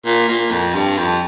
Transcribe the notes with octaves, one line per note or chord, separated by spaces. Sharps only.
A#2
A#2
F2
G2
F2